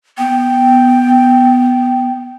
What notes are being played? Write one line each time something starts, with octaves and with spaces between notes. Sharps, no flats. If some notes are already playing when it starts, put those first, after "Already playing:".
B3 G5